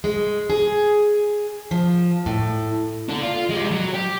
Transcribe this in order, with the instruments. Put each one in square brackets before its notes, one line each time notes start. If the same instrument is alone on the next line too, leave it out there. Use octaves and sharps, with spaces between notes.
[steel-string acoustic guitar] G#3
G#4
F3
A2
[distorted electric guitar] D4 A4
F4
G#3 G4
F#3
G4